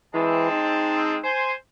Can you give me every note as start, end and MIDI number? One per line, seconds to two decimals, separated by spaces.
0.14 0.51 52
0.14 1.16 56
0.14 1.16 60
0.14 1.16 81
0.51 1.27 63
1.24 1.54 72
1.24 1.54 80
1.24 1.54 84